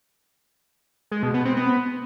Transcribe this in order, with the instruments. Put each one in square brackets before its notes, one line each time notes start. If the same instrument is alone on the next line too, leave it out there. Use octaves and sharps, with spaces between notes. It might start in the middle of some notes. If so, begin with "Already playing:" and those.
[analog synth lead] G#3
B2
B3
C4
B3